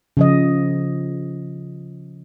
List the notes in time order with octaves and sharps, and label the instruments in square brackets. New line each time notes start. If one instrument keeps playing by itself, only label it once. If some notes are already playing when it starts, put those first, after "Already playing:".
[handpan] C#3 F3 D#5